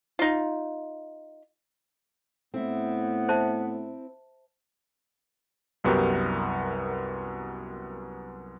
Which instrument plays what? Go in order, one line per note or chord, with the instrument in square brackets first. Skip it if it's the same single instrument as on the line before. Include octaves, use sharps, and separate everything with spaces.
[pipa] D#4 F4
[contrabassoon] A2 [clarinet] B3 [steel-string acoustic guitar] C4 E4
[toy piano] C5 E5 A5
[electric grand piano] C2 F#2 B3 F#4 G4 A#4